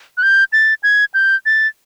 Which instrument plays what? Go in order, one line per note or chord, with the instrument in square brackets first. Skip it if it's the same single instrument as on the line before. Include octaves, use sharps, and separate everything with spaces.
[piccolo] F#6
G6
A6
G#6
G6
A6